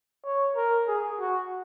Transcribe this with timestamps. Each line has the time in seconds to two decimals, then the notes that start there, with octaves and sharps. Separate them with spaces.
0.24 C#5
0.56 A#4
0.87 G#4
1.19 F#4